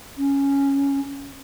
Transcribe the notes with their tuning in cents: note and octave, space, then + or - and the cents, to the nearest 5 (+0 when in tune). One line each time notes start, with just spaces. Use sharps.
C#4 +0